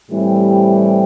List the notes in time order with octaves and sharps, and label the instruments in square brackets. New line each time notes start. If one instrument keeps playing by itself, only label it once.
[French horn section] A2 E3 G3 C4 G4